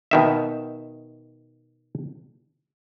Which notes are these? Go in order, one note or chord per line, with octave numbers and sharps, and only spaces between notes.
B2 D#3 E5